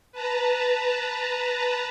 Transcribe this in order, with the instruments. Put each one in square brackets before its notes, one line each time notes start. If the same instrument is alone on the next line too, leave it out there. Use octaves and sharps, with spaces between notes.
[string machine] B4 A5 A#5